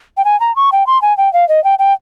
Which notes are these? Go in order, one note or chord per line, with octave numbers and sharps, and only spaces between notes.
G5
G#5
A#5
C#6
G5
C6
G#5
G5
F5
D#5
G5
G5